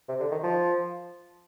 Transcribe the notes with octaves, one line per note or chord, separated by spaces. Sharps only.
C3
D3
D#3
F3